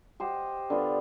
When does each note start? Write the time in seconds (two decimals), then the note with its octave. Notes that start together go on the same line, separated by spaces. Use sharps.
0.20 G4 C5 D#5 F#5
0.70 D3 B3 F4